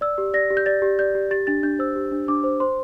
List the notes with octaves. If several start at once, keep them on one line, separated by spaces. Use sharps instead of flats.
D5 E6
G4
D5 A#6
G4
G6
D5 A6
G4
D5 G6
G4
G4 A6
D4 A6
D4 G6
C5 E6
G4
D4
D4 D6
C5
C5 C6